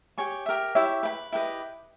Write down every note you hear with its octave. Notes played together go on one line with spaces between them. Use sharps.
G4 C#5 G#5 C#6
G4 A#4 E5
E4 G4 C#5 E5
B4 G5 B5
E4 G4 B4 D#5